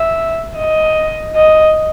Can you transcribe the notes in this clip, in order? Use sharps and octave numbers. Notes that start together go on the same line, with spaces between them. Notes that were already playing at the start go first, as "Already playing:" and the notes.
Already playing: E5
D#5
D#5